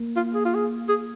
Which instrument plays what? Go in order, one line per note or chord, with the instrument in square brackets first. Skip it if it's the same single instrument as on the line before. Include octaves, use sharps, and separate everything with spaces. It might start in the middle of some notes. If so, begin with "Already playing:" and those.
Already playing: [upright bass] A#3
[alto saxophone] F4
G#4
F4
G#4
G#4